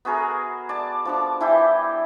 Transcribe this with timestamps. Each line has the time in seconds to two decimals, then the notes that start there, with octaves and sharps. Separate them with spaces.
0.05 B3 F#4 G#4 A#4
0.69 D5 A5
1.05 F3 D4 D6
1.41 E3 E4 G4 G5